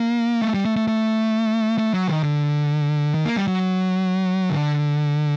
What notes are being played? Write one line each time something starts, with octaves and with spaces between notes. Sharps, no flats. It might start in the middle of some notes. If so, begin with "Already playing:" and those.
Already playing: A#3
A3
G3
A3
A3
A3
A3
F#3
D#3
D3
D#3
A#3
G3
F#3
D3